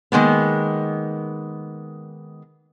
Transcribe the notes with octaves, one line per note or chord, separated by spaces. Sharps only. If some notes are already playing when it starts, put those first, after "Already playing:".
D#3 G#3 A#3 B3